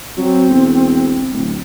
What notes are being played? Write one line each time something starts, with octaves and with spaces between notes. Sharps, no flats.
F#3 C4
E1
D1